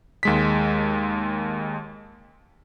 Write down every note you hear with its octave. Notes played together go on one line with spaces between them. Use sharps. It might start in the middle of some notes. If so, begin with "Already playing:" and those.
D#2 G#3 B6